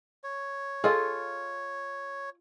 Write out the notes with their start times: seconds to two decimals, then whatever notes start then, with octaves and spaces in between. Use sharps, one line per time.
0.23 C#5
0.84 F4 G#4 A4 D#5